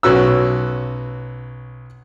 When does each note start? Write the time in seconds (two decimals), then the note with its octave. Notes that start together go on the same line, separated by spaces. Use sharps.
0.03 B1 C#4 F#4 B4 E6